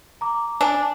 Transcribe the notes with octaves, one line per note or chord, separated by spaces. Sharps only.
A#5 D6
D4 G#5